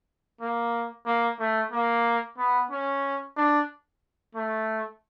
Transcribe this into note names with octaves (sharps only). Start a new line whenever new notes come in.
A#3
A#3
A3
A#3
B3
C#4
D4
A3